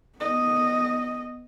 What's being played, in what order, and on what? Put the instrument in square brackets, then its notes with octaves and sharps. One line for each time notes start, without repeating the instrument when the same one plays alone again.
[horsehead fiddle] B3 D#5